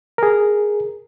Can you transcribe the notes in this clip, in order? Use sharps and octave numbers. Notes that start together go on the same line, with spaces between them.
G#4 A#4